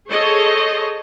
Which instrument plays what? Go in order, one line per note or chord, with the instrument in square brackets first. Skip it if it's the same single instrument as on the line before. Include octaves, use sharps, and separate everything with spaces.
[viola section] G#4 A4 C5 C#5 D#5